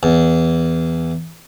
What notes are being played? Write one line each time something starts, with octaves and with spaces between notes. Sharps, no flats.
E2